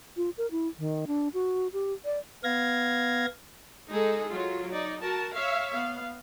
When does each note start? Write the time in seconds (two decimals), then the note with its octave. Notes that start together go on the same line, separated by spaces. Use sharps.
0.17 F4
0.38 A#4
0.51 E4
0.79 D#3
1.07 D4
1.34 F#4
1.73 G4
2.05 D5
2.44 B3 F5 G#6 A#6
3.90 G#3 D#4 G#4 A4
4.30 F#3 F4
4.73 D#4 D5
5.04 F#4 A#4 A5
5.35 C#5 E5 F5
5.73 B3 F5